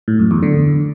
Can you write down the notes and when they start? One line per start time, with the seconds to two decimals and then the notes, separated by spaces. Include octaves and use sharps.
0.08 A2
0.19 F#2
0.31 E2
0.43 D3